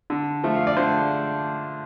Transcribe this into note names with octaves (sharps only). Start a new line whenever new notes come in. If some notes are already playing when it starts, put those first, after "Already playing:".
D3
F3 A3
F5
D5
D3 C5